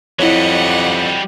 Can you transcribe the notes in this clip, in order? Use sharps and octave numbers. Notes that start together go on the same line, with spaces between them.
F2 F#3 G3 E4 C#5 D#5 F#5